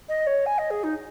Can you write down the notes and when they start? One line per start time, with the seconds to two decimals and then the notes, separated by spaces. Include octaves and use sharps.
0.09 D#5
0.27 C#5
0.46 G#5
0.58 D#5
0.70 G#4
0.83 D#4